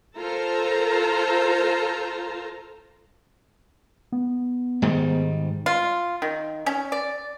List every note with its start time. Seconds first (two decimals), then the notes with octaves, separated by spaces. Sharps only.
0.18 F4 A4 A#4 C5 A5 A#5
4.12 B3
4.82 G#2 D#3 G3
5.66 F4
6.22 D#3
6.66 C#4
6.92 D5